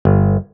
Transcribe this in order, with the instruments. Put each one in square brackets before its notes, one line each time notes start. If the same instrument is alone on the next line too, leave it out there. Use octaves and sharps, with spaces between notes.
[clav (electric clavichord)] G1